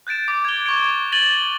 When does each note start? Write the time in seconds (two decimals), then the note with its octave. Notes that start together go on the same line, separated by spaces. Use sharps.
0.07 F#6 G6 A6 D7 E7
0.28 D6
0.45 G#6 G7
0.66 C#6 G#6 D7
1.12 G#6 A6 D#7 F#7 G7